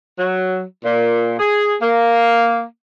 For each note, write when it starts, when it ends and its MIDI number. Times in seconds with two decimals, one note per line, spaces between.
0.19 0.63 54
0.85 1.35 46
1.39 1.74 68
1.81 2.64 58